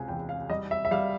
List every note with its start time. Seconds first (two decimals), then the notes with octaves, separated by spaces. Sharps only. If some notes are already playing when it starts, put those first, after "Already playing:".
Already playing: C#2 C3 G#5
0.08 E2 G5
0.29 F5
0.50 G3 D#5
0.71 E5
0.85 E5
0.91 G3 F5